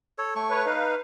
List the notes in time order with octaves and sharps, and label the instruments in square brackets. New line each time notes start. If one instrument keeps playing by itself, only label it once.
[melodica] A4 C#5
A3 C#6
[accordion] B4 C#5
[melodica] D#4 [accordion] B4 F5